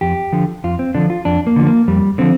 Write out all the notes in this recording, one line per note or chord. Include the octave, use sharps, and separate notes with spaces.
F2 G4
D3 F3
F2 F4
C4
D3 F3 D4
F4
F2 D4
A#3
D3 F3
A#3
F2 G3
D3 F3 C4